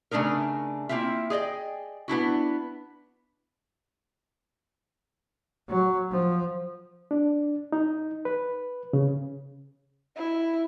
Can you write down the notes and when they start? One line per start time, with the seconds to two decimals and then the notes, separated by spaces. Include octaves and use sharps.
0.11 C#3 A3 D4 D#4 A#4
0.89 A#3 C4 E4 F4 E5
1.30 G#4 D5 D#5 G5
2.08 B3 D4 E4 F#4
5.69 F#3
6.11 F3
7.11 D4
7.72 D#4
8.25 B4
8.93 C#3
10.16 E4